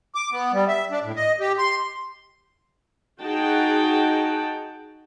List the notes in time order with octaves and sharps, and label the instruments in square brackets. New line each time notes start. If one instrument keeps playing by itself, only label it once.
[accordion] D6
B3
G3
E5
D4
A2
D#5
G4
C6
[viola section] D#4 F#4 G#4 F#5 G5 A5